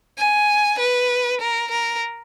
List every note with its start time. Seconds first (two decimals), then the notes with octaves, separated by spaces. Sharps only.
0.19 G#5
0.79 B4
1.41 A#4
1.71 A#4